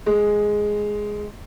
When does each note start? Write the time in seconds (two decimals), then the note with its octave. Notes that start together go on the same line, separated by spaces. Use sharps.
0.06 G#3